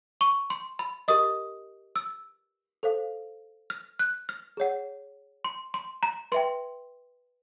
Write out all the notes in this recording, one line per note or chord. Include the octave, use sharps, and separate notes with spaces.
C#6
C6
B5
G4 A#4 D#5 D#6
E6
A4 C5 F5
F6
F#6
F6
G#4 C#5 F#5
C6
C6
A#5
B4 E5 G5 C6